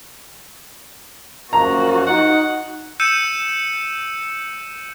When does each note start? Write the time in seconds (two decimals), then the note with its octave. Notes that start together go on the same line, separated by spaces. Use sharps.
1.53 F#2 F3 A#3 F#4 A#5
2.06 D#4 F#5
3.00 E6 G6 C#7 D#7 E7